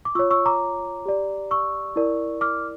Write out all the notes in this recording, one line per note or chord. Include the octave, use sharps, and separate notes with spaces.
D6
F4 C#5 C#6 E6
C#6 E6
A#5 D6
G4 D5
C#6 E6
E4 A#4 D5
D6 F6